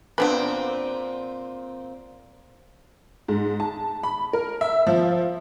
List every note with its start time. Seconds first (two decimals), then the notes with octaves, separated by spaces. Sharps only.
0.18 A#2 B3 C4 D4 B4
3.28 G#2
3.60 A5
4.03 B5
4.33 A#4
4.61 E5
4.87 F3